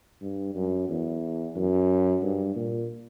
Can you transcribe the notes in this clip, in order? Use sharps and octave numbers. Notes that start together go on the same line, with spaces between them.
G2
F#2
E2
F#2
G2
A#2